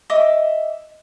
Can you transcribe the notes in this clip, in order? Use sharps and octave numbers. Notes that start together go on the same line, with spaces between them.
D#5 E5 D6